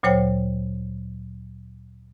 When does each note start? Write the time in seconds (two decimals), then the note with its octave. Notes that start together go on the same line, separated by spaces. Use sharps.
0.03 D2 A#2 F#3 C5 C#5 G5